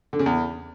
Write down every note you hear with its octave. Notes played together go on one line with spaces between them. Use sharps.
D3
C#3
E2